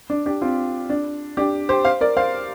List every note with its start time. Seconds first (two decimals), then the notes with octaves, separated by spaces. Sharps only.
0.10 D4
0.26 D4 G4
0.42 C4 F4
0.90 D4
1.37 D4 G4
1.69 G4 C5
1.85 C5 F5
2.01 A#4 D5
2.17 C5 F5